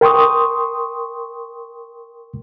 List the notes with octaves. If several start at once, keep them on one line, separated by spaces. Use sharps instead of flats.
A#4 G5 C6 C#6 D#6